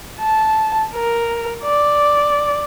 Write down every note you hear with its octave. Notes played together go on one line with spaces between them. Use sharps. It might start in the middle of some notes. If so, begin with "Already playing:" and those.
A5
A#4
D5